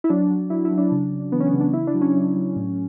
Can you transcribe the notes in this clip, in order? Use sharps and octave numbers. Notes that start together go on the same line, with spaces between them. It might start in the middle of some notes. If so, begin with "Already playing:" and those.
E4
F#3 D4
F#3
F#3 E4
E4
F#3
D4
C#3
C#3
E3 B3
C#4
B3
C#3
D4
C#3 E4
D4
F#3
C#4
F#3
F#3
A2